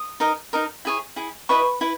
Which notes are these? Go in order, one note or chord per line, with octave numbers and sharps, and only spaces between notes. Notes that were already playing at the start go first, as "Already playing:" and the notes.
Already playing: D#6
D#4 A#4 D#5
D#4 A#4 D#5
E4 G#4 C#5
E4 G#4
E4 B4 D#5 C#6
E4 B4